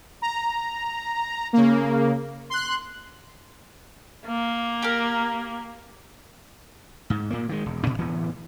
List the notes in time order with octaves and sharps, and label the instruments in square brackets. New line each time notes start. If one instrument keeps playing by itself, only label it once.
[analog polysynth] A#5
C#3 A#3
C6 F#6
[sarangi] A#3
[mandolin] G4 A#4
[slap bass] G#2
A#2 A#3
D#3 G#3
E1
A2 D4
D1 E3 B3